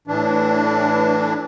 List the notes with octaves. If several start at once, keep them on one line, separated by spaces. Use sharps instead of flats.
A2 E3 D4